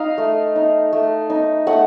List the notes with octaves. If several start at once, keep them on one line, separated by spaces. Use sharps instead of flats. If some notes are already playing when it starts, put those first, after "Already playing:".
Already playing: D#4 D#5 F5
A3
D#4
A3
D#4
A3 F#5